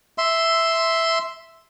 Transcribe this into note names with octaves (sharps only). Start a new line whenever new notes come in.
E5 C6